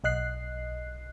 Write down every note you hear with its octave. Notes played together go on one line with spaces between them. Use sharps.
B1 D#5 F#6 C7